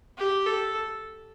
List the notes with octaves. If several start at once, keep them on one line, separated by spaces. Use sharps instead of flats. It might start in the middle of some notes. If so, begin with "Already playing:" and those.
G4
A4